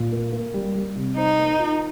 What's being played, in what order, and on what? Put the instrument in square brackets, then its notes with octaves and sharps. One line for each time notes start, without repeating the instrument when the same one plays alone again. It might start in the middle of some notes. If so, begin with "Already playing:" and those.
Already playing: [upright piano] A#2
A#3
A#3
G3
G3
C3
[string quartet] D#4 [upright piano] C5
[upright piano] A#3
F4